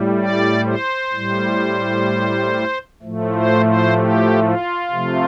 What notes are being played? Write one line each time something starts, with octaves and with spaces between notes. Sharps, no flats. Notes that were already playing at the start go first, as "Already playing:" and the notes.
Already playing: A2 G3
D5
C5
A2 G3
A2 F3 A3
C5
C5
G4
F4
C3 F3 A3